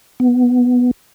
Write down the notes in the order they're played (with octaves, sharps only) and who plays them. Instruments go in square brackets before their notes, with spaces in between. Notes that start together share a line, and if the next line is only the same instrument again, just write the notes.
[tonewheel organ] B3